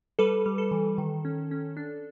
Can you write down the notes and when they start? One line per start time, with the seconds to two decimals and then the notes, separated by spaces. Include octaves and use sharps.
0.19 G3 A4 B4
0.46 G3
0.58 A4
0.71 E3
0.98 D#3
1.25 C#4
1.51 C#4
1.77 D4